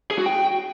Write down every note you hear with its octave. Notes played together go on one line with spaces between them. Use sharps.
G#4
F#4
G5